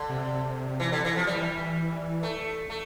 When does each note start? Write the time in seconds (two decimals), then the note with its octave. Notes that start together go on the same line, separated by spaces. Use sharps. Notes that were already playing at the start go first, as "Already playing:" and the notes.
Already playing: D3
0.09 C3
0.80 E3
0.92 D3
1.05 E3
1.16 F3
1.27 E3 G3
2.23 A3
2.70 A3